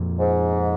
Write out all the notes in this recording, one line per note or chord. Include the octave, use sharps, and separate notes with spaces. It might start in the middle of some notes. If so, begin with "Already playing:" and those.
Already playing: F2 A#2
G#2